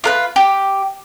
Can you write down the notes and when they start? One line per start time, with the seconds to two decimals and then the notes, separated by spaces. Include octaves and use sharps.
0.04 F4 A#4 B4
0.36 G4